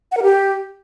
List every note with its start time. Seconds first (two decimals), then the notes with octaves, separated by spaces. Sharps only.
0.12 F#5
0.17 A#4
0.23 G4